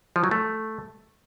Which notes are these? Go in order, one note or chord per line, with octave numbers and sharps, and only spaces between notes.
F3
F#3
A3